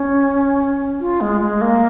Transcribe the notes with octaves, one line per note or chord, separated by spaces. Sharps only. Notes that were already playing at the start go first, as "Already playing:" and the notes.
Already playing: C#4
F4
G#3
G#3
A#3